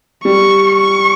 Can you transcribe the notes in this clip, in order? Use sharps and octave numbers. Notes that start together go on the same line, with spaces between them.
G3 C#6
C#6